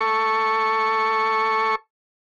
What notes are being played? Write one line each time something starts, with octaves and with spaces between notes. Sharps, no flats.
A4 C#6